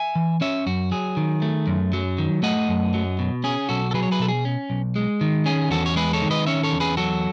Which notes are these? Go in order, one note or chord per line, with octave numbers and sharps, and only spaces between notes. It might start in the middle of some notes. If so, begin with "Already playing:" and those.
Already playing: E5 G#5
E3
C#4 C#5 E5
F#2 F#4
F#3 G#4
D#3
A3
F#2
F#3
D#3
A3 D#5 F#5
F#2
F#3
B2
C#4 G#4
B1 F#4 A4
A4
F#3 G#4 B4
C#5
G#4 B4
B2 A4
G#4
C#4
B1
G#3
D#3
C#4 G#4
E2 F#4 A4
C#5
G#3 G#4 B4
A4 C#5
D#3
B4 D#5
C#4 C#5 E5
A4 C#5
E2
G#4 B4
F#3 F#4 A4